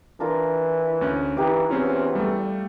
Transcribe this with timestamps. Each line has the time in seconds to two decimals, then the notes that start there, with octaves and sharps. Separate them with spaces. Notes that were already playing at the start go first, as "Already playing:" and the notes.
0.20 E3 D4 F4 A#4
1.01 D2 C#4 F#6
1.37 E3 D#4 G4 F5 D6
1.70 E2 C4 C#4 F4
2.15 G3 A3